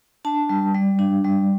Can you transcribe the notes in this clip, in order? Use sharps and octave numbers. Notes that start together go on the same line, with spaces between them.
D4 A5
G3
G3
D4
G3